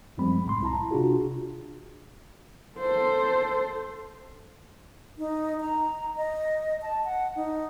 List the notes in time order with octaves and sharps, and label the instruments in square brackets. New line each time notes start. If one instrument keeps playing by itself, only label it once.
[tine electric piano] F#2 F3 G3 G#3 C4 B5
C2 A2 B5 C6
E4 A5 A#5
C3 D4 F4 F#4 G#4
[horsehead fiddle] A4 C5
[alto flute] D#4
A#5
D#5
A5
F#5
D#4